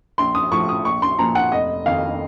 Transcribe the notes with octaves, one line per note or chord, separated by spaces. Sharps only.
A#1 C6
D#6
A2 F3 C#6
D#6
A#1 C#6
C6
A#2 F3 A#5
F#5
F1 D#5
F2 D#3 F5